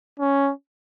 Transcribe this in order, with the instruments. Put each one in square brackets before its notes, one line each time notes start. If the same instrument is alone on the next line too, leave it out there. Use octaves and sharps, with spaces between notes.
[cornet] C#4